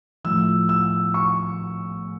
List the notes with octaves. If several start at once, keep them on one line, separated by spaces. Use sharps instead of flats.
A2 F3 E6
E6
C#6